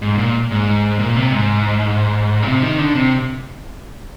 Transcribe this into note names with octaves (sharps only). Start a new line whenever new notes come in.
G#2
A#2
G#2
A#2
C3
G#2
A#2
C3
D#3
D3
C3